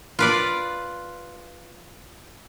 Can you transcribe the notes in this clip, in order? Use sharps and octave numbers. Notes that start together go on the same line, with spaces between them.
F4 B4 D5